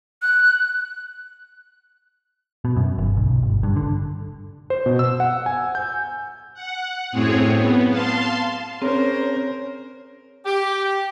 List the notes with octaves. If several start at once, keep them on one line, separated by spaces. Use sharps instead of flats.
F#6
B2
F#2
G1
B1
G1
G2
D3
C5
B2
E6
F#5
G#5
G6
F#5
F#2 A2 C4 G#4 C#5
B3
F5 A5 C6
C4 C#4 G#4 A#4 C5 C#5
G4